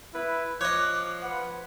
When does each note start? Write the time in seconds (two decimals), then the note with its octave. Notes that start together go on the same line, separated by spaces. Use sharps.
0.15 E4 B4
0.61 F3 C#5 D#5 D6 F#6
1.22 B4 F#5